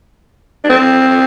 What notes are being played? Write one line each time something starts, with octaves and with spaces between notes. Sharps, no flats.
D4
C4